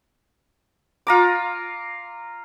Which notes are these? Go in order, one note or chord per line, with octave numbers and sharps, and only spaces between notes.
F4 A#5 D6